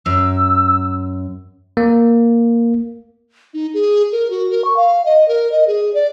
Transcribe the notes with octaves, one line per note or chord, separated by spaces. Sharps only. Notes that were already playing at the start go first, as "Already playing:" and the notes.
F#2 E6
A#3
D#4
G#4
A#4
F#4
A#4
C#6
F5
D#5
A#4
D#5
G#4
D5